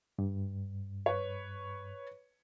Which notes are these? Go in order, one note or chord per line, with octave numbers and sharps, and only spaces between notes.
G2
B4 C#5